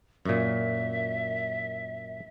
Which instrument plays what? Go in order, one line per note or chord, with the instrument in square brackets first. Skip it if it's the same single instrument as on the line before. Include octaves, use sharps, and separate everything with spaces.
[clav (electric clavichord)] F#2 A#2 [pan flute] E5